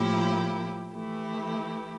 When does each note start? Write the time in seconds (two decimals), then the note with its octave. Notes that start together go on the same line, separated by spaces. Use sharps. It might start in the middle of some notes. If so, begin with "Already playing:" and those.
Already playing: A2 F3 A#3 E4 G4
0.92 E3 A3 E4 G4